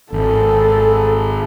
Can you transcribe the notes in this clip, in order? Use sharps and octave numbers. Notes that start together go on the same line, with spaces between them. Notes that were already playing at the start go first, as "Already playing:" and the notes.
G#1 A4